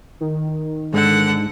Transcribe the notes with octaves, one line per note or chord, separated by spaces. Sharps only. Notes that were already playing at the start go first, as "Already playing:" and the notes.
D#3
G#2 D3 F#5